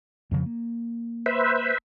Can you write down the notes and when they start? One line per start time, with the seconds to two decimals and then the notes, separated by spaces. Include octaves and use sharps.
0.31 F2 C#3 F3
0.46 A#3
1.26 B4 C5 E5